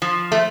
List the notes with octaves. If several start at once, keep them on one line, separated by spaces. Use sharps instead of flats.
F3
A3